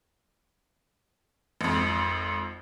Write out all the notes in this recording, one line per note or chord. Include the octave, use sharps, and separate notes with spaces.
G#1 F2